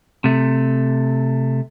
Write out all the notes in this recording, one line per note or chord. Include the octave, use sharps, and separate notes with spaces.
C3 A3